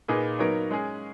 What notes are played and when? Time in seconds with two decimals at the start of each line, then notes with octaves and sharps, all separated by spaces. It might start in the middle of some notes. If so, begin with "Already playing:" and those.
0.08 A#2 A#3 D#4 G#4 B4
0.39 F#3 B3 D#4 A#4 C#5
0.71 G#3 C#4 G#4